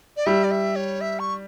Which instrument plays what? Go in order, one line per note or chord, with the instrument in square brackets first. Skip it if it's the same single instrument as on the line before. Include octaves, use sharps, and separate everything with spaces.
[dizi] D5
[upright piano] G3 [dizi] E5
[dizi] D5
E5
C#5
E5
C#6